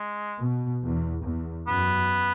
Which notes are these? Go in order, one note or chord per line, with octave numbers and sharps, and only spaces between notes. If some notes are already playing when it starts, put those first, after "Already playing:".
Already playing: G#3
B2
E2
E2
F#2 B3